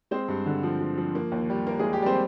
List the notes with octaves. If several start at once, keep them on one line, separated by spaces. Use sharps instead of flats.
G#3 C4 C5
G2
D3
F3
F3
F3
A#3
D#2
G3
A#3 A#4
G#3 G#4
A#3
G4
G3 C4 C5